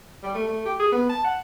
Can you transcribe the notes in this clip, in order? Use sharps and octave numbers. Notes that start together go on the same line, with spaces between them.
G3
A3
A3
G4
G#4
B3
A5
F#5